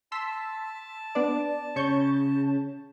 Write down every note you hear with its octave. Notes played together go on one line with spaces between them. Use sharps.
A5 C6 E6 B6
B3 D4 D5
C#3 C#5 C#6 G6